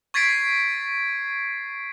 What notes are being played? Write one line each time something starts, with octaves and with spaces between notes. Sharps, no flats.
C#6 G#6 A6 B6 C7 D7